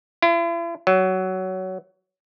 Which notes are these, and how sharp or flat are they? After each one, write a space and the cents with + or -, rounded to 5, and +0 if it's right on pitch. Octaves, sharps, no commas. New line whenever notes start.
E4 +45
F#3 +15